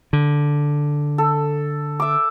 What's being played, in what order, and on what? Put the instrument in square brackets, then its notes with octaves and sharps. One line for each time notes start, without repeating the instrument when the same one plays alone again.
[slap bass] D3
[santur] A4
E5 D6